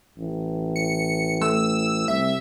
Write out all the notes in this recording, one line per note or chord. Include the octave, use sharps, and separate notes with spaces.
A1
C#7
A3 E6
C2 E5